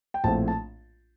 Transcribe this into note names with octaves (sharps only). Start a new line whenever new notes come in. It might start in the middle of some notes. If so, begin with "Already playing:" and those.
G5
A#1 A2 A3 C4 A5
A5